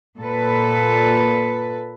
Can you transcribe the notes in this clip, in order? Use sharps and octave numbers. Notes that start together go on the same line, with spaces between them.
A#2 A4 B4